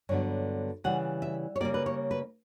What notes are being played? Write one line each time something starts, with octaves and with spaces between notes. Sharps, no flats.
G2 D3 F#3 B3 C#5
C#3 E3 G3 F#5
E5
C#5
C#3 G3 A#3 D5
B4
C#5
B4